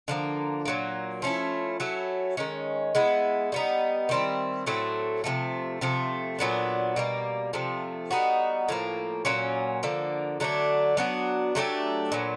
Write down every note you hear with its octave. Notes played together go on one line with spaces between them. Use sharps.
D3 F3 A#3
A#2 F#3 A#3
F3 A3 C#4 E4
F#3 A3 C#4 E4
D#3 G#3 C#4
G#3 B3 E4
G3 B3 D#4
D#3 G3 C4 E4
A2 F#3 A3 C4
C3 F3 A3
C3 F3 A3
A#2 F#3 B3 D4
B2 G3 A#3
C3 F3 A3
G3 B3 D#4 F#4
A2 F3 A#3
A#2 F#3 A#3 C#4
D3 F3 A#3
D3 F#3 A3 D4
F#3 B3 D4 F#4
F#3 A3 D4 G4
A#2 F#3 B3